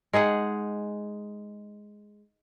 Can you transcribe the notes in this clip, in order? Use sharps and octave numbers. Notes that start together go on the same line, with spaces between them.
G#3 D#4 G#4 F#5